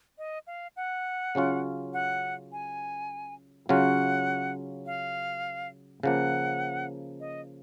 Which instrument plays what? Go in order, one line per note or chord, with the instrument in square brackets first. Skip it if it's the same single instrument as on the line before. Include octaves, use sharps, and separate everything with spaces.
[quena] D#5
F5
F#5
[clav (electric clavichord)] C#3 F#3 C#4 F4
[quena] F#5
G#5
[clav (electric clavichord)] C#3 F#3 C#4 F4 [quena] F#5
[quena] F5
[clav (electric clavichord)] C#3 F3 A#3 [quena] F#5
[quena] D#5